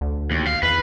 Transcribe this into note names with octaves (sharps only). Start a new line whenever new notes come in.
D2
D#2
F5
E2 B4